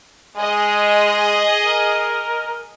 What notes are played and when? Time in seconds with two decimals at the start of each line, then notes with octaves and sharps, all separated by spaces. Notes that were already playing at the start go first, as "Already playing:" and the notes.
0.37 G#3 G#4 D#5
1.66 A#4